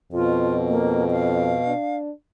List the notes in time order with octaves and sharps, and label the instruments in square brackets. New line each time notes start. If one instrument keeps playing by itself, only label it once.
[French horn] F2 [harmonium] B2 [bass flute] F4
[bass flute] A#3
F5
[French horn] D4